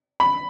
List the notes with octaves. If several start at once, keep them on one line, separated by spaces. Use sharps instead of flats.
B5